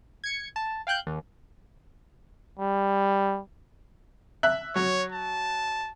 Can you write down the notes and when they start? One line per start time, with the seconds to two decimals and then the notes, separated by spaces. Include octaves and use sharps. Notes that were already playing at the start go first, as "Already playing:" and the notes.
0.24 G#6 C#7
0.56 A5
0.87 F5 G5 F#6 G6
1.07 D#2
2.59 G3
4.43 E5 F#6
4.76 F#3 C#5
5.12 A5